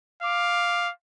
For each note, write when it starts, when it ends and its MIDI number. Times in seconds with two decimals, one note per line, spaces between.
0.23 0.91 77
0.23 0.88 86